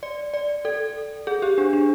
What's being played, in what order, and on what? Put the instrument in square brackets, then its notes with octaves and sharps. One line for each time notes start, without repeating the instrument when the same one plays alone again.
[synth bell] D5
D5
A4
G#4
G4
D4
D4